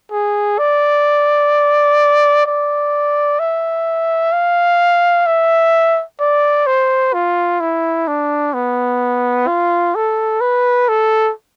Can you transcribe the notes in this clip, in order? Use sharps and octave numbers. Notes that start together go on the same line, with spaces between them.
G#4
D5
D5
E5
F5
E5
D5
C5
F4
E4
D4
B3
F4
A4
B4
A4